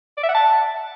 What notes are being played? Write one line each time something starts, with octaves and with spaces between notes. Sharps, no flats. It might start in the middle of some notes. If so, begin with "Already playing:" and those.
D5
E5
F#5
A5